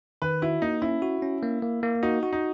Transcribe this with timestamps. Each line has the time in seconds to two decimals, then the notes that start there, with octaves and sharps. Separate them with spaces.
0.22 D#3 B4
0.42 E4 F#4
0.62 A#3 D#4
0.82 C#4 E4
1.02 F#4
1.22 C#4
1.43 A#3
1.62 A#3
1.83 A#3
2.03 D#4 F#4
2.23 F#4
2.33 D#4